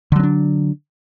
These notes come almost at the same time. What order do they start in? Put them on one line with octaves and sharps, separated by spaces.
D3 F#3 C#4 D4